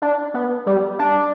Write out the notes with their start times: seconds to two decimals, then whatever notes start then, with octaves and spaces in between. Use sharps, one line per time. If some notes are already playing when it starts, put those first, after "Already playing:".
0.02 D4
0.34 B3
0.66 G3
0.99 D4